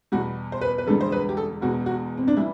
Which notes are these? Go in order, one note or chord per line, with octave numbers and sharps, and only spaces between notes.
E2 B2 G3 F#4
C5
B4
B4
E1 E2 D3 G3 A4
C5
B4
G4
A4
E1 E2 B2 F#4
F#4
C4
D4
E3 G3 E4